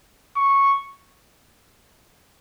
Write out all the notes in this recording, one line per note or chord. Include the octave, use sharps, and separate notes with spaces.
C#6